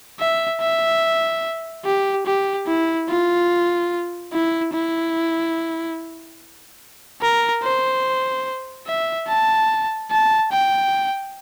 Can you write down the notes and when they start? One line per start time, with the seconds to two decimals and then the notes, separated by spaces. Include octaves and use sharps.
0.20 E5
0.61 E5
1.85 G4
2.26 G4
2.67 E4
3.09 F4
4.33 E4
4.73 E4
7.22 A#4
7.63 C5
8.87 E5
9.28 A5
10.11 A5
10.52 G5